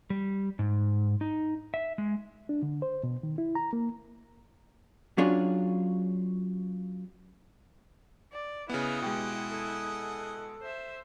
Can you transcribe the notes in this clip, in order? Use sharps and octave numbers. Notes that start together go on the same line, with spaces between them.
G3
G#2
D#4
E5
G#3
D4
D3
C5
B2
D#3
E4
A#5
A#3
F#3 C#4 D4 F4 G#4 D5
D5
C#3 B3 E4 G#4 D#5 F#5
B2 G#3 G4
A4
C5 E5